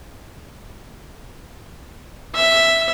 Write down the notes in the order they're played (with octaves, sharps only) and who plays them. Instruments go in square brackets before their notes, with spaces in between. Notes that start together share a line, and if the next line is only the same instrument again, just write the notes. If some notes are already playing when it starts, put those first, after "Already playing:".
[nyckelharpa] E5